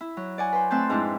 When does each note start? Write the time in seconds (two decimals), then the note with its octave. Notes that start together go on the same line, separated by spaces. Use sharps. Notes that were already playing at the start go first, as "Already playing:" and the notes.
0.01 E4
0.17 F#3
0.38 D5 F#5 G#5
0.52 B4 C5
0.70 A3 C4 B4 C5 A5 G6
0.89 F2 G#2 D4 E4